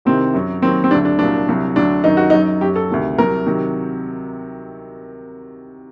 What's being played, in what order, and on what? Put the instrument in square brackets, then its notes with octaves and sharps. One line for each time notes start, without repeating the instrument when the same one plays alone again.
[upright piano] C2 C3 D#3 C4
F#2 F#3
D#2 D#3 F#3 C4
C4
D2 D3 F#3 D4
D4
C2 A#2 F#3 D4
C2 C3 F#3
D2 D3 F#3 D4
F#2 D#3 F#3 D#4
F#4
F#2 F#3 D#4
F#2 F#3 G4
A4
D2 C3 D#3
C2 C3 F#3 A#4
C3 D#3 F#3